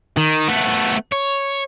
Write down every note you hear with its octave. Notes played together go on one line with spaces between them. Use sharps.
D#3
A3 B3
C#5